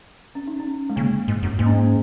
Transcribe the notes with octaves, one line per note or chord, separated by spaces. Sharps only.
C#4
D#4
C#4
G#3
C#3 A#3
G#2
F#2
G#2 A#3
C#4
A#3